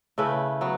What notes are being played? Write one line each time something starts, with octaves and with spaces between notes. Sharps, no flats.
C#3 A3 E4 B4
F#3 B3